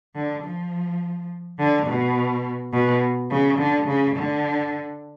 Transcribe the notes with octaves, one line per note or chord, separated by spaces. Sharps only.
D3
F3
D3
B2
B2
C#3
D3
C#3
D3